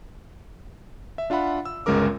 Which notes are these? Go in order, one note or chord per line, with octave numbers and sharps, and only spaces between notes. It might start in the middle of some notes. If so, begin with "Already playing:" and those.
E5
D4 F4 E5 F#5 B5
E6
G1 C#2 G#3 C#4 A#4 D6